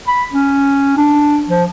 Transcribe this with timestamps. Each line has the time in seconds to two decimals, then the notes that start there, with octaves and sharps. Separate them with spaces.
0.08 B5
0.33 C#4
0.97 D4
1.49 F3